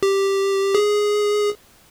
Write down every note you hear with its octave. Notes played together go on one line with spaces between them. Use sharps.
G4
G#4